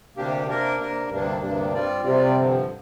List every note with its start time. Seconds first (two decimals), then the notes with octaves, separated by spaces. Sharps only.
0.16 D2 C3 A#3 D4 G4
0.47 C3 A#3 D4 A#4
0.79 C3 A#3 D4 A#4
1.10 D2 G2 C3 A#3 D4
1.41 D2 G2 C3 A#3 D4
1.73 G3 C4 F4 D5
2.05 C3 G3 C4 F4 D5
2.36 G2 D3 F3